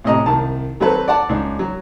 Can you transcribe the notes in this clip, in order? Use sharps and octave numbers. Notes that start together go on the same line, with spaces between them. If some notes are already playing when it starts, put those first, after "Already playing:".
A1 C3 D#5 A#5
C2 D#3 A5
D#3 F#3 C4 A4 B4
D5 F#5 A5
C#2 D4 D#4
F#3